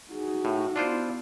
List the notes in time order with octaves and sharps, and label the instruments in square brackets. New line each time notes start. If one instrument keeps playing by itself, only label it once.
[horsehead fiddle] D#4 F#4 [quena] G#4
[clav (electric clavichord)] A2
[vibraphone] B3 E4 [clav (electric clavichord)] D4 F4 C5 [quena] D5